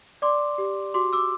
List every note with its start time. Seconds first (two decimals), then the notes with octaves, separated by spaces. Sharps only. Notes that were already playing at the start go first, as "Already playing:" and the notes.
0.22 D5 C6 D6
0.58 G4
0.94 F#4 C6 D6
1.13 D6 E6